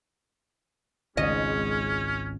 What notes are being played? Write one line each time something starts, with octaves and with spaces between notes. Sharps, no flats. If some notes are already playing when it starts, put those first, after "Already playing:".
G#1 C#2 G#2 G#3 C#4 D#5